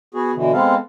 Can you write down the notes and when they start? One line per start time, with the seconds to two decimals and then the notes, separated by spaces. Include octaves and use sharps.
0.15 B3 F#4 G#4
0.35 B2 D3 E3
0.53 G#3 B3 C4 A4 F5